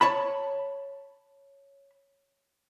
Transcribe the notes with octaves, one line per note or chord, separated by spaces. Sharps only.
C#5 A5 B5